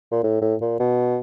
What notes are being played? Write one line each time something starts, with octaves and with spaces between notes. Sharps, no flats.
A#2
A2
A2
A#2
B2